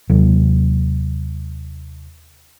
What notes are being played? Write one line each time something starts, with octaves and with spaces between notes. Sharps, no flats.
D#2 C3 F#3